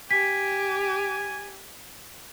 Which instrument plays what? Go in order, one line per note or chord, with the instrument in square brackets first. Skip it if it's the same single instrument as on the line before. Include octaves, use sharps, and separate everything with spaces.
[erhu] G4 [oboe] G#5 [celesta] B6